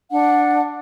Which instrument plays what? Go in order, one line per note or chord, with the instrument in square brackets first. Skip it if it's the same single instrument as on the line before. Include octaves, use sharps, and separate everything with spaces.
[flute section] D4 F#5